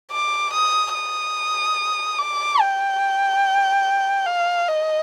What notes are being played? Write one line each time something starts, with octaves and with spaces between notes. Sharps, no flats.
D6
D#6
D#6
D6
G5
F5
D#5